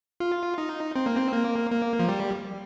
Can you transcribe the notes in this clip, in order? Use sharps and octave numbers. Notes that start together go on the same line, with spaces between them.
F4
D#4
C4
A#3
C4
A#3
A#3
F3
G3